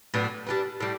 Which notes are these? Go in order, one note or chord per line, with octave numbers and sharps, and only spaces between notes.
A2 F#3 B3 D4
G3 D4 G4 B4
A2 G3